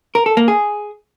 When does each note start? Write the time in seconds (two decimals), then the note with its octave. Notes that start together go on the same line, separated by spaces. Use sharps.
0.15 A#4
0.26 A4
0.37 A#3
0.48 G#4